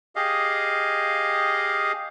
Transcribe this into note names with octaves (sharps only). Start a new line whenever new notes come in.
G4 G#4 D#5 F5